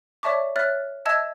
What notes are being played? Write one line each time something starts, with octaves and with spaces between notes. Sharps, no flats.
C#5 D5 E5 A5 C#6 D6
C#5 E5 F6 F#6 A6
D#5 E5 A5 E6 G#6